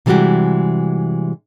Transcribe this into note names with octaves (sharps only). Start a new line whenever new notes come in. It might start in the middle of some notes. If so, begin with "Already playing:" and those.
C3 E3 G3 G#3 F#4 G4